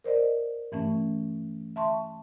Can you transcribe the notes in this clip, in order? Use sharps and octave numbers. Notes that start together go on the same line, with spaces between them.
A#4 C5 D5 D#5
G2 E3 A3 C#4
E5 A5 C6 C#6